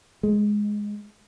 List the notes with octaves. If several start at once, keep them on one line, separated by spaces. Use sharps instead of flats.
G#3